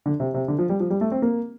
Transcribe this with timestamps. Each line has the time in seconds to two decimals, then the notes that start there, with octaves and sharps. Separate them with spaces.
0.06 D3
0.20 C3
0.34 C3
0.48 D3
0.59 F3
0.69 G3
0.80 F3
0.90 G3
1.01 A3
1.12 C4
1.22 A#3